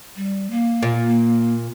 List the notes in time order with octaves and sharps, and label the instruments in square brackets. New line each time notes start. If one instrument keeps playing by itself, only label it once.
[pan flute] G3
A#3
[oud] A#2